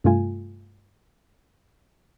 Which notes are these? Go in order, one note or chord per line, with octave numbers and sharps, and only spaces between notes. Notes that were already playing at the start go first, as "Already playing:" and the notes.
G2 C3 A3 F4 G#5